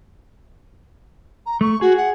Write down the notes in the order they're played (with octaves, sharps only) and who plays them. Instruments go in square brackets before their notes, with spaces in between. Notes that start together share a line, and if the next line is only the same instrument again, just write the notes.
[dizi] A#5
[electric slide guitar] A3 [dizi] C#6
[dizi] F#4 [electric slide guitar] G#4
[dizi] F#5